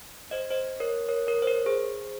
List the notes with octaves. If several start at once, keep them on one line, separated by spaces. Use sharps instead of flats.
C5 D#5
C5 D#5
A#4 C#5
A#4 C#5
A#4 C#5
C5
A#4 C#5
G#4 C5